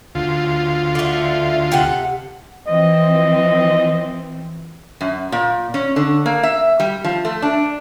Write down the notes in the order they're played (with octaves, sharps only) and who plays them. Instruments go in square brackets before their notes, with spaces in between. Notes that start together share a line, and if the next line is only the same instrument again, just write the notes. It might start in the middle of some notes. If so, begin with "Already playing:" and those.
[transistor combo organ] D2 F4
[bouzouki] D3 A3
C3 A4 F#5
[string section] E3 F3 C4 [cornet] D#5
[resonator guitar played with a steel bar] F#2
A#2
C#4
D3
A#3
E5
G3
F3
A3
D4